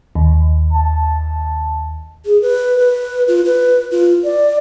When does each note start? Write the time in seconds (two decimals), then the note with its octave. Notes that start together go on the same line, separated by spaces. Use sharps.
0.15 D#2
0.73 A5
2.26 G#4
2.42 B4
2.79 B4
3.28 F4
3.45 B4
3.91 F4
4.24 D5